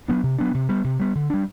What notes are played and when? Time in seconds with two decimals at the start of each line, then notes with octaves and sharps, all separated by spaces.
0.08 F#3 B3 D4
0.23 C3
0.38 F#3 B3 D4
0.54 C3
0.69 G3 B3
0.84 C3
1.00 G3 B3
1.15 D3
1.30 G3 D4